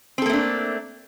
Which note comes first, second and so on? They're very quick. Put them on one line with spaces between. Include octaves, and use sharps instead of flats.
C4 A4 A#3 A3 D4